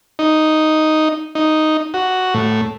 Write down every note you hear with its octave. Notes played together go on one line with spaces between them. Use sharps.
D#4
D#4
F#4
A2